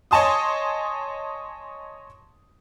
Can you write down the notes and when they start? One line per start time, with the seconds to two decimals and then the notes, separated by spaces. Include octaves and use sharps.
0.11 C#5 D#5 G#5 A5 C6 D#6